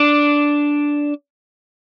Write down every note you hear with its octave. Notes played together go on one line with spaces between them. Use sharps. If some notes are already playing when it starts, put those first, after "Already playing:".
Already playing: D4